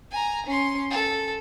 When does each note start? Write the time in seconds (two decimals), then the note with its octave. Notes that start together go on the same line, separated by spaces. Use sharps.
0.12 G#5 A#5
0.46 C#4 C6
0.91 A4